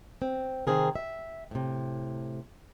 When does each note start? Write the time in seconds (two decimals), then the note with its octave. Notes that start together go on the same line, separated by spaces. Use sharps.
0.22 C4
0.67 C3 D#3 C4 G#4 A#4
0.95 E5
1.51 A2 C3